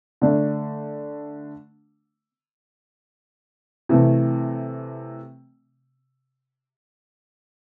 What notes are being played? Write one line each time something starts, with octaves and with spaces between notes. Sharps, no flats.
D3 A3 D4
C3 E3 A3